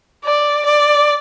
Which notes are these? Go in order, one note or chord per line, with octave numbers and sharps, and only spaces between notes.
D5
D5